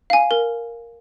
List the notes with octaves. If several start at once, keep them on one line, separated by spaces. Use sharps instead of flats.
F5 G#5
A#4